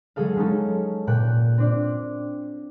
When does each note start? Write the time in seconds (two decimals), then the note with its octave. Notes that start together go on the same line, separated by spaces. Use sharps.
0.16 F#3 G#3 G#4 A4 F5
0.36 G#3 C#4 D#4 A4
1.07 A#2 G5 F#6 D7
1.58 C4 D4 D5